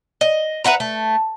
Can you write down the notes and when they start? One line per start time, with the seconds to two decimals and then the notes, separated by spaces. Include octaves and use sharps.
0.21 D#5
0.64 B4 E5 F#5 A#5
0.80 A3